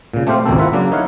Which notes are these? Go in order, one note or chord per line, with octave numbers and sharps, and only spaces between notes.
A#2 C#3
A3 C4 G4 C5 F5
G#1 C#2 B2 A#3 C4 A4
C4 E4 F4 A#4 E5 F#5
C#3 F#3 A#3 D4
D3 D#4 E4 C#5 F5 F#5